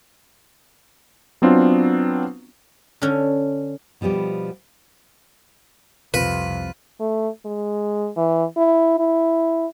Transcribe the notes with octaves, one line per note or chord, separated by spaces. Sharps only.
F#3 B3 C4 D4 F4
D3 C#4
B2 F3 G3 B3 G4
C2 F2 C3 C4 F4 B4
A3
G#3
E3
E4
E4